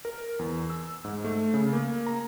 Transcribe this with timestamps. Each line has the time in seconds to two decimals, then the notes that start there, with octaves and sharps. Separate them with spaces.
0.05 A#4
0.39 E2
0.70 E6
1.05 G#2
1.25 A3
1.54 C#3
1.73 A#3
2.07 A#5